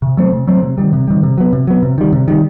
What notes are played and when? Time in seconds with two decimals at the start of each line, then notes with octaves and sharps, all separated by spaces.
0.02 C3
0.17 F#3 A3 C4
0.32 C3
0.47 F#3 A3 C4
0.63 C3
0.78 D#3 G3
0.93 C3
1.08 D#3 G3
1.23 C3
1.38 F#3 B3
1.53 C3
1.67 F#3 B3
1.83 C3
1.98 D#3 G3
2.13 C3
2.28 D#3 G3